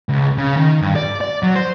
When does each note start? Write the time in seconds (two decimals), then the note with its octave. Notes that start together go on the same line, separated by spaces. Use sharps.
0.09 C#2
0.38 C#3
0.57 D#3
0.82 G2
0.96 D5
1.21 D5
1.43 F#3
1.56 C5